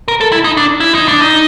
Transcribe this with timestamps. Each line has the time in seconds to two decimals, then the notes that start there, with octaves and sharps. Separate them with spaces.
0.08 A#4
0.21 A4
0.32 E4
0.44 D#4
0.57 D4
0.80 E4
0.95 D#4
1.08 D4
1.22 D#4